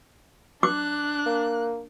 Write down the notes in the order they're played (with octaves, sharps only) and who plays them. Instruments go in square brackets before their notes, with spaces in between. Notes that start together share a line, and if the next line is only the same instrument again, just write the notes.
[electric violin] D4 [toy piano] D6 [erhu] F#6
[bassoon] A#3